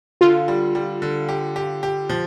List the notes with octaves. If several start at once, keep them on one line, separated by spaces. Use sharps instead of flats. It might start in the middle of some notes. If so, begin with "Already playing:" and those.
D3 F4
G3
G3
D3
G4
G4
G4
F3